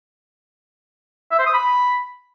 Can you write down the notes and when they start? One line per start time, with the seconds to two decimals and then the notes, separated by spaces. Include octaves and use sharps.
1.31 E5
1.39 C5
1.46 D#6
1.54 B5